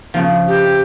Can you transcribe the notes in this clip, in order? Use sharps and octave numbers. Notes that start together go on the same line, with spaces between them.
C#3 F3
G4